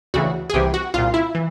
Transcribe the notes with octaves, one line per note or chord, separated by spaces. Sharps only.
D2 C#3 E3 F#4
G#4
C2 C3 E3 G4
F#4
C2 A#2 F4
E4
E3